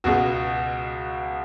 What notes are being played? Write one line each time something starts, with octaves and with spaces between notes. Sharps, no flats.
C#2 B2 G#3 F#4